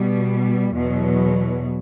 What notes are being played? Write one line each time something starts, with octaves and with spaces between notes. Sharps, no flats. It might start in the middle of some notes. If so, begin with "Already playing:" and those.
Already playing: B2 G3
E2 B2 F#3